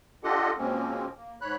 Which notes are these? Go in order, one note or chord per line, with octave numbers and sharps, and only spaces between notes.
D4 F4 G4 A4 D#5 F#5
B2 F3 G#3 A#3 C4 C#4
A#3
G#2 C#5 B5 F#6